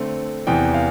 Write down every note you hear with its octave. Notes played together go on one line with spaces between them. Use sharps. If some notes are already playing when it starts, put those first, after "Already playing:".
Already playing: D3 A3 C4
E2 C3 E3 G5
F5